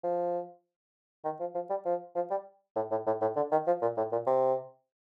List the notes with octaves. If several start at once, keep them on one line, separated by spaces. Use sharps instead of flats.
F3
D#3
F3
F3
G3
F3
F3
G3
A2
A2
A2
A2
D3
D#3
F3
A#2
A2
A#2
C3